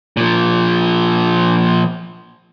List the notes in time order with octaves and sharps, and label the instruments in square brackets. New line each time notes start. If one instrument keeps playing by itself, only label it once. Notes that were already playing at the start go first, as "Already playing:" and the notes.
[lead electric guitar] A#2 F3